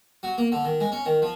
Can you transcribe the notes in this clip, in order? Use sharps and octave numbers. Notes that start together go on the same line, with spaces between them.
F#3
A#3
D3
D#3
G#3
C#4
D#3
F3